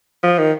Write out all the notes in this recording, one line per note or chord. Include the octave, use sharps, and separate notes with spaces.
F3
D#3